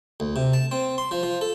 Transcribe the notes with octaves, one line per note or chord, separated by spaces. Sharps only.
D2
C3
A5
C4
C6
F3
F3
A4